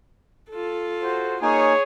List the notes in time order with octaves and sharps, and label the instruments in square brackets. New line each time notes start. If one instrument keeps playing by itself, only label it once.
[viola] F4 A4
[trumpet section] F#4 C5
[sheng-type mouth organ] A#3 D#4 G#5 [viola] G#4 [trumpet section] C#5